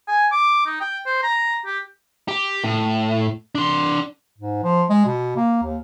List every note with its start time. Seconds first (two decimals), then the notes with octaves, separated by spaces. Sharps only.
0.08 G#5
0.32 D6
0.66 D#4
0.81 G5
1.06 C5
1.24 A#5
1.66 G4
2.28 G4
2.64 A2
3.55 D4 C6
4.38 G#2
4.63 F3
4.89 G#3
5.06 B2
5.36 A#3
5.63 D#2